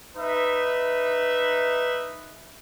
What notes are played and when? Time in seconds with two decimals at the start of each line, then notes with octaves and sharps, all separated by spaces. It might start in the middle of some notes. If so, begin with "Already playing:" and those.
0.17 D#4 B4 E5